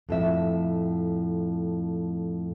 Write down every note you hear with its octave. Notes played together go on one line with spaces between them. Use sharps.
F2 A2 E5